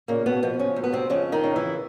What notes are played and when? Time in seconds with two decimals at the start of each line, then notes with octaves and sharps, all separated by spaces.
0.08 A#2 C#3 A#3
0.26 B2 B3
0.43 B2 F3 B3
0.59 C#3 C#4
0.76 D2
0.83 B3
0.93 C3 C4
1.10 F2 C#3 C#4
1.32 D#3 D#4
1.44 C#3
1.56 E3 E4